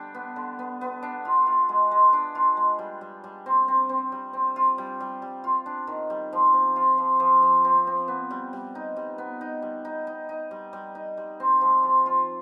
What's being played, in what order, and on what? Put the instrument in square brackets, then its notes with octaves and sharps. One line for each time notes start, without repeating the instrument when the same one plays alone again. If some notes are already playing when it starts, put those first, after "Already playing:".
Already playing: [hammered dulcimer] D3 G3 D4
B3
D3
B3
B3
D4
F4
F4
G#3
G#3
D4
F4
G#3
G3
G3
G3
C4
C4
C4
G3
C4
F4
G3
G3
G3
F4
D4
D#3
G3
F3
C4
F4
F3
F3
F3
C4
C4
B3
G3
G3
D#4
G3
B3
D#4
G3
D#4
D#4
D#4
G3
G3
D#4
G3
C4
F3
F4
F4